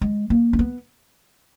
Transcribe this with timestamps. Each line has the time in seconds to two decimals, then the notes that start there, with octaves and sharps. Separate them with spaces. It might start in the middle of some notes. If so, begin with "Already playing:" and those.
0.01 G#3
0.30 A#3
0.53 C#4
0.59 B3